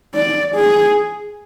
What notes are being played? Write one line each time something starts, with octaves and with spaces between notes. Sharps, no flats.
D5
G#4